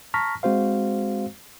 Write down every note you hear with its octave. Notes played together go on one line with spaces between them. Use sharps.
A5 A#5 C#6 F6 A#6 B6
G#3 C4 F#4 C5 F5